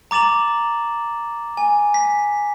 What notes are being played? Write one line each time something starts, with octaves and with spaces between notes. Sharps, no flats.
A#5 D6 A6 E7 F#7
G#5
B6